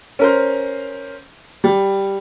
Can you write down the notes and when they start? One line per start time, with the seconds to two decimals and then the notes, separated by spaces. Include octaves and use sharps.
0.19 C#4 A#4 C5
1.64 G3